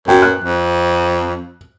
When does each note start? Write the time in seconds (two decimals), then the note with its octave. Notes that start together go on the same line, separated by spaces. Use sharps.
0.08 F#2 F#4 G5
0.22 F#6
0.44 F2